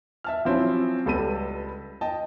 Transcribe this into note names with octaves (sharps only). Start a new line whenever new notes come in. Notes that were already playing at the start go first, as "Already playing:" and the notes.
E5 A5 F6
F3 F#3 C4 C#4 E4
C#2 G3 A4 B4 B5 D#7
D#5 G5 A5